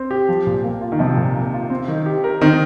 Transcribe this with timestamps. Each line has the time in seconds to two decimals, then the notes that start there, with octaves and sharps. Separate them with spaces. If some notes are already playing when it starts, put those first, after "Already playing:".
Already playing: C4
0.11 G4
0.29 F3
0.47 A#2
0.64 A#3
0.81 F4
0.92 D#3
0.99 C3 F3
1.17 A#2
1.35 A#3
1.53 F4
1.70 C4
1.88 D#3
2.06 G4
2.24 A#4
2.41 D#3 C4